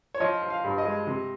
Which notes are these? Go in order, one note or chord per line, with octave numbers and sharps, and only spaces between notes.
C#5
F3 D#5
F3
F5
G2
D#5
G#3
C3